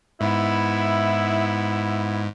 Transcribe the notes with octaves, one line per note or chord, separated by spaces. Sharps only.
G#2 B3 E4